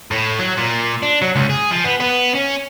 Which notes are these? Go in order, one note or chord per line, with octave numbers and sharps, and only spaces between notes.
A2
F#3
A#2
D4
F#3
C#2
G#4
F3
B3
B3
C#4